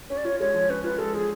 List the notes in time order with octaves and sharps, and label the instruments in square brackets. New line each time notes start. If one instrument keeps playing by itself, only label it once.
[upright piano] C#4 [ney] C#5
[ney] D5
[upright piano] F4 [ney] C#5
[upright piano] G#3 [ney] C#5
[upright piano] F3
[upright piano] C#4 [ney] B4
[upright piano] F4 [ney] B4
[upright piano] G#3 [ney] A4
[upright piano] F3 [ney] G#4